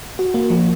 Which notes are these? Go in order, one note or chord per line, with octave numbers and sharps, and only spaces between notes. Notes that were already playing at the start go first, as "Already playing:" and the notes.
F#4
A#3
F3